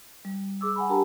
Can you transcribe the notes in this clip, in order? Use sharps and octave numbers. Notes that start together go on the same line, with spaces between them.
G3
G#4 D6 E6
F#5 G#5 B5
D4 G4 A#4 G5 A5 A#5